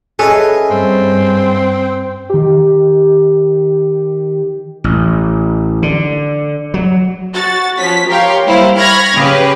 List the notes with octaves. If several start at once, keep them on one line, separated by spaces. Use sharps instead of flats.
C#4 G#4 A4 B4 D#5 E5
G2 C4
D#3 G4
A1
D3
F#3
F#4 A6
F3 C#4 B6
G4 A#4 C#5 F5 G5 C6
G3 A#3 E4 C5 F5
B5 C#6 F6 G#6 A#6
C#3 G4 B4